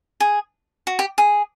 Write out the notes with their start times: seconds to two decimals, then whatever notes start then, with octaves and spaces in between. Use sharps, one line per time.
0.20 G#4
0.87 F#4
0.99 G4
1.18 G#4